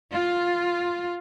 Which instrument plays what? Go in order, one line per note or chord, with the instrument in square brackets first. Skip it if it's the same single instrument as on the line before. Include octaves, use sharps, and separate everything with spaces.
[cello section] F4